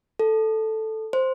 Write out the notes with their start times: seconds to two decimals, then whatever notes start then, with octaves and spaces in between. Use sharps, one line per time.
0.19 A4
1.13 C5